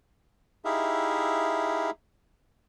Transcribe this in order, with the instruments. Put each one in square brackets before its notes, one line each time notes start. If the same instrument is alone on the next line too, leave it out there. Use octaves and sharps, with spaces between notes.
[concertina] D#4 E4 G4 G#4 E5 F5